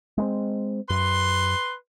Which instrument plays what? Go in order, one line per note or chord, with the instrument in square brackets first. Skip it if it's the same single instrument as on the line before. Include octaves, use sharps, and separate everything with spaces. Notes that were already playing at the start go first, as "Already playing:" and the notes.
[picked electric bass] G#3 B3 C4
[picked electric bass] F#2 [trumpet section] B4 C6